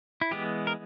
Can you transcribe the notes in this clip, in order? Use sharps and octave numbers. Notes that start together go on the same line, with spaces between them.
E4
E3 G#3 B3 G4
A#4